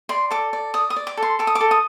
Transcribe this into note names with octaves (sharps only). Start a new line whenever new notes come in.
D5 C6
A4 D6
D5
D5 D#6
D#6
D5
D6
A4
C6
A4 D6
D#6
D6
A4
D#6